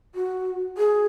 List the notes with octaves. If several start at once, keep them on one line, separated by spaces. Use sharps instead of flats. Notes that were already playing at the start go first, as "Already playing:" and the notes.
F#4
G#4